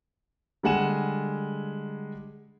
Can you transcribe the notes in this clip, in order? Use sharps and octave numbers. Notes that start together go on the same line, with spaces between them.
D3 G3 G#3 F#5 G#5 E7